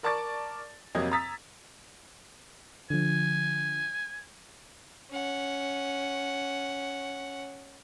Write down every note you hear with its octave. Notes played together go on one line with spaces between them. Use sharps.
A#4 D5 A5 C#6 D6 A6
F2 C3 F#3 A#3 D#5 G#6
A#5 D#6 E6 A6 B6
D3 F3 G#5
C#4 F#5